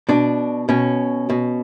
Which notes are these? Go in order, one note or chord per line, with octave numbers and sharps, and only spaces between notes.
B2 D4
B2 C#4
B2